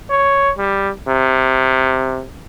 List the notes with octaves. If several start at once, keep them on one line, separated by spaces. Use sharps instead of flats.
C#5
G3
C3